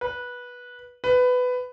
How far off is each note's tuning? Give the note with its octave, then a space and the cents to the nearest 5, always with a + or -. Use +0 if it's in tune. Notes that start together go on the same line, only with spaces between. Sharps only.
B4 -15
B4 +15